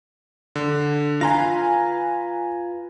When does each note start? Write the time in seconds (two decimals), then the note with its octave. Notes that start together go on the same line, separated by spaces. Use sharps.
0.56 D3
1.21 F4 B4 G#5 A#5 C6 A#6